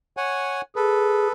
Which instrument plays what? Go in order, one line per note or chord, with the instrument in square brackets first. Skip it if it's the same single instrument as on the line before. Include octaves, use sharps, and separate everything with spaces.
[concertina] C#5 F#5 G#5
[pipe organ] G#4 [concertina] A4 B4